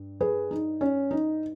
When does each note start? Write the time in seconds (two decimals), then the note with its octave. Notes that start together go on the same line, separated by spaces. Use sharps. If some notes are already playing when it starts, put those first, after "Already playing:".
Already playing: G2
0.20 G#4 B4
0.51 D#4
0.81 C#4
1.11 D#4